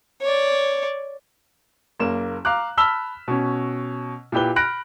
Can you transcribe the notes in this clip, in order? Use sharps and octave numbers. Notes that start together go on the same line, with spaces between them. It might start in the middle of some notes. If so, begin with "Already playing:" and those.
C#5 D5
F#1 A#3 E7
F5 A#5 D6 F#6
A5 B5 E6 F6 B6 G7
B2 C#4
A#2 E4 G4 B4 G7
B5 F6 F#6 A#6 D7